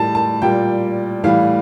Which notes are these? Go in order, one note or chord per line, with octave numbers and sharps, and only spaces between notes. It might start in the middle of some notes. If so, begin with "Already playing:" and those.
Already playing: A2 G3 A5
A5
A#2 G3 G5
A2 E3 G3 F5